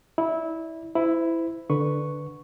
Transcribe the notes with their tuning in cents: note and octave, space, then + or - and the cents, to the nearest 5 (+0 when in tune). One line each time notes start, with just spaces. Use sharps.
E4 -20 D5 +0
E4 +0 C5 -35
D3 +0 B4 +0 C#6 +0